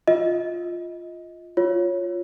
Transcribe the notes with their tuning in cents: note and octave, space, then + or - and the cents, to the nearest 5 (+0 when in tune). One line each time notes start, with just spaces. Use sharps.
F4 +0 D#5 +25
F4 +0 C#5 +0